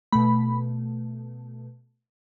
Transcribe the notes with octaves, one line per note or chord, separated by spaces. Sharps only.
B2 A3 B5